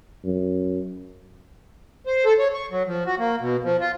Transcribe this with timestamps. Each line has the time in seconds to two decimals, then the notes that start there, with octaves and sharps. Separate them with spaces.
0.25 F#2
2.06 C5
2.25 A4
2.39 C#5
2.54 C#6
2.71 F#3
2.87 F3
3.06 F#4
3.19 A#3
3.41 B2
3.64 F3
3.80 F4